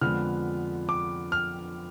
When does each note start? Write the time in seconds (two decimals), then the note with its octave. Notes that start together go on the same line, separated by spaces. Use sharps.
0.01 F2 D3 F3 G#3 B3 F6
0.89 D6
1.32 F6